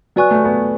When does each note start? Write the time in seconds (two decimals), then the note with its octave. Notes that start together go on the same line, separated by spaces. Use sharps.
0.16 F#3 B4 D5 G#5 C#6 F#6
0.31 A3
0.45 B3